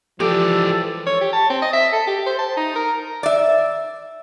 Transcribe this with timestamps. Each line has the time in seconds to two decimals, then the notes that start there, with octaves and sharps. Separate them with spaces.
0.20 E3 F3 G#3 G4 A4 D5
1.07 C#5
1.21 G4
1.33 A5
1.50 C4
1.62 D#5
1.73 E5
1.93 A4
2.07 G4
2.26 C5
2.39 A5
2.57 D#4
2.76 A#4
3.23 D5 E5